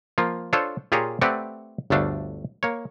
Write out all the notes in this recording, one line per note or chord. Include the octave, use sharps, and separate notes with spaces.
F3 A#3 F4
D4 F4 A4 C5 C#5
A#2 F4 G4 G#4 C#5 A#5
A3 C4 G4 B4 D5 F#5
G1 D2 A3 D4 F5
A#3 C#5